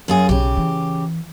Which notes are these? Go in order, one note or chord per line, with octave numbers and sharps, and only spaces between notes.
F#2 F4 G#4
B1 C#3 G4
E3